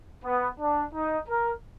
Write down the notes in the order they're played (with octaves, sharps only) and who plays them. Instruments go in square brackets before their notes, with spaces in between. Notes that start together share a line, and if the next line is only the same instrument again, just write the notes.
[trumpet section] B3
D4
D#4
A#4